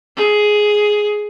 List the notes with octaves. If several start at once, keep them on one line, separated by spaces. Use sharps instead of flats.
G#4